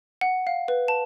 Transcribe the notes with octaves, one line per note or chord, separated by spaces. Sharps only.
F#5
F5
B4
A5